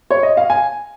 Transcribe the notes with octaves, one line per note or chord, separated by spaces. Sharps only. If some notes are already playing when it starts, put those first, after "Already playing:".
C#5
D#5
F5
G#5